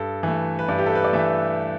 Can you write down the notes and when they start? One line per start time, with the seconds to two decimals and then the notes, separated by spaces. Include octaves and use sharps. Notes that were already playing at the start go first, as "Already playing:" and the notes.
Already playing: G2 A4
0.23 E3 A3
0.59 B4
0.68 G2 D5
0.78 G4
0.86 A4
0.95 B4
1.04 D5
1.13 E3 A3 E5